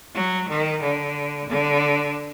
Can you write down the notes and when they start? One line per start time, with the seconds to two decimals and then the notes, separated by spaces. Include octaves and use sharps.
0.15 F#3
0.49 D#3
0.82 D3
1.50 D3